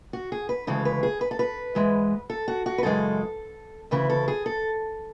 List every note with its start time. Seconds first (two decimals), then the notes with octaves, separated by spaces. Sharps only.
0.13 F#4
0.32 G#4
0.49 B4
0.67 D2 C#3 E3 G#3 A4
0.85 B4
1.03 G#4
1.21 B4
1.31 A4
1.39 B4
1.75 G#2 E3 G#3
2.30 A4
2.48 F#4
2.66 F#4
2.78 B4
2.83 F#2 C#3 E3 G#3 A4
3.91 D2 C#3 E3 B4
4.10 A4
4.28 G#4
4.46 A4